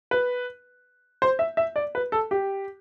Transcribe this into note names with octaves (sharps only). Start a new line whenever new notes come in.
B4
C5
E5
E5
D5
B4
A4
G4